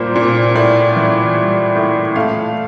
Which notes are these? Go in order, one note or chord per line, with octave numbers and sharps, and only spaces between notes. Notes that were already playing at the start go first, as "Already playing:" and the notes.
Already playing: A#2 G3 A#3 C5
A#2
A2 D5
E3
G3
A2
A3 F5